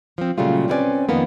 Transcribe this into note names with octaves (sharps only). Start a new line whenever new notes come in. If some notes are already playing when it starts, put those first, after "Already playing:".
F3 C4
A#2 C#3 F#3 G3 A3 F4
C4 C#4 E4 B4 D5 G#5
F2 D#3 A#3 B3